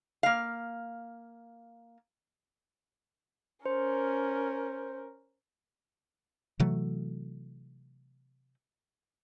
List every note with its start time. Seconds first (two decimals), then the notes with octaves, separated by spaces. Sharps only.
0.23 A#3 F5
3.66 C#4 A#4 C5
6.60 C3 E3 F#3 A3